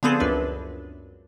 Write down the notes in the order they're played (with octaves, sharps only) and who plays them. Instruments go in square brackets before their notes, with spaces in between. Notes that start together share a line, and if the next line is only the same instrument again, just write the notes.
[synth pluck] D3 F3 B3 C4 G#4 A4
C#2 F#2 D4 B4